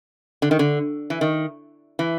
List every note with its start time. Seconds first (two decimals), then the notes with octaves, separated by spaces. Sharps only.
0.42 D3
0.51 D#3
0.59 D3
1.10 E3
1.21 D#3
1.99 E3